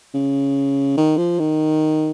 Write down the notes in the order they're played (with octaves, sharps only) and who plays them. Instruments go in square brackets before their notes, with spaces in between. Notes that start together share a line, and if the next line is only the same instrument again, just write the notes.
[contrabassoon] C#3
D#3
F3
D#3